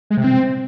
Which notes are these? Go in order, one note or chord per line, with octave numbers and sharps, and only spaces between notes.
G#3
C3
C4